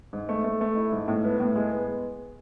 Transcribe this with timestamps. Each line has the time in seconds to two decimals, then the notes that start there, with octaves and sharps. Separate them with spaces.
0.13 G#2
0.29 A3
0.44 A3
0.61 A3
0.76 E4
0.92 G#2
1.08 A2
1.25 B3
1.40 A2
1.56 G#3
1.71 B3